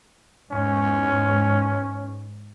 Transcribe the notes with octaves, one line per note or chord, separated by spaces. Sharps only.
E2 G#2 C#4